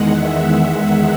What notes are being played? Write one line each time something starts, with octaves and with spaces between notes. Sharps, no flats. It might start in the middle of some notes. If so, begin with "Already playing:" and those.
Already playing: E2 D#3 G#3 F#5
E5